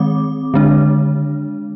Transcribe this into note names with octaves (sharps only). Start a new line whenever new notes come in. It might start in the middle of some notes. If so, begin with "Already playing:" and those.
Already playing: D#3 G#3 C4 D6
D3 G#3 D4